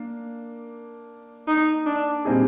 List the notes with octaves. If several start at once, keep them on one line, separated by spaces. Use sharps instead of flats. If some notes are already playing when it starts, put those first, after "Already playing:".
Already playing: A#3 D4
D#4
D4
A#2 G3 C4 D#4 G#4